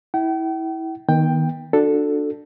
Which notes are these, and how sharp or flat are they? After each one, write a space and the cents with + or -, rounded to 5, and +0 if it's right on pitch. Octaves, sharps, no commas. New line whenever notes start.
E4 -20 G5 -40
D#3 +5 B3 -30 G5 +10
D4 +10 F#4 -30 A4 +0